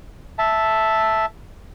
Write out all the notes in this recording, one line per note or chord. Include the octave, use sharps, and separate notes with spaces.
E5 A5